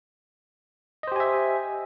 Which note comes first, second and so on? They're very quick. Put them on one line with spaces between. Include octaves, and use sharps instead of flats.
D#5 C5 G4 G#5 E5